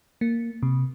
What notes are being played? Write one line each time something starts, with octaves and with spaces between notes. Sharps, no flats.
A#3
C3